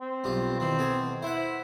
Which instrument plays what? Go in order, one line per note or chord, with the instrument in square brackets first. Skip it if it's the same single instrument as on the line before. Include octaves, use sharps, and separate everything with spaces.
[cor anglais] C4
[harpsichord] B1 G2 F4
[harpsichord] D#3 E3 [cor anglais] C4
[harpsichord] B2 A4 G#5
[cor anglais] E4 [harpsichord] C5 F#5